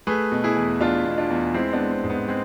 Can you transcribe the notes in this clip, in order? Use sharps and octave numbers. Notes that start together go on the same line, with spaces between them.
A3 G#4 B4
B2
E4 G#4
E2
B2 D4 F4
B2
D4 F4
E2
G#3 C4 E4
B3 D4
G#3
C4
G#2
B3
G#3 C4